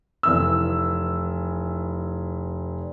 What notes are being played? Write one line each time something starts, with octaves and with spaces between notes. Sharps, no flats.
F1 E3 E6